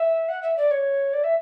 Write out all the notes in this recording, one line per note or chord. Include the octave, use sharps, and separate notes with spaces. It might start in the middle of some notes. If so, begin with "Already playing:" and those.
Already playing: E5
F#5
E5
D5
C#5
D5
E5